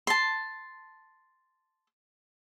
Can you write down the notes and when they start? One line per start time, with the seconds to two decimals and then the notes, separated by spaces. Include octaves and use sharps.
0.07 A5 C6